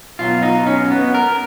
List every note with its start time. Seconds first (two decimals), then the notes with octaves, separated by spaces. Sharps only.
0.19 B2 F#3 F4
0.42 D#4
0.67 C#4
0.91 B3
1.14 A#4